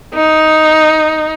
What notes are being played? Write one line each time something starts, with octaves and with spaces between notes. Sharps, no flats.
D#4